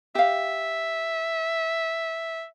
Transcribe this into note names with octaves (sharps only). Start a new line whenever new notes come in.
G4 E5 F5